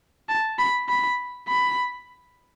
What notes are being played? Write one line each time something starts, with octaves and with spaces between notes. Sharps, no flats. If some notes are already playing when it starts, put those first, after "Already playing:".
A5
B5
B5
B5